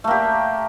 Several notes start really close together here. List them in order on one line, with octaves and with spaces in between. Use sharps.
A3 A#3 G4